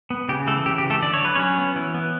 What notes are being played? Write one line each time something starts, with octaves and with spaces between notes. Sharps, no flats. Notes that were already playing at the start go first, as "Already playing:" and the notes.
B3
C#3 G4
E3 A3 A4
C#3 G4
G4
E3
A3 A4
D3 D5
C#5
F#3 B4
F#3 C#4 C#5
B3
E3
B3